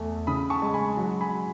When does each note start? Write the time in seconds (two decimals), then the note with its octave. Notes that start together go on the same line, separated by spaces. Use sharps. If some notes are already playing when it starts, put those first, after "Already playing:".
Already playing: E2 A3
0.27 C#3 B5 D#6
0.50 A5 C#6
0.62 G#3
0.74 G#5 B5
0.97 F#3
1.21 G#5 B5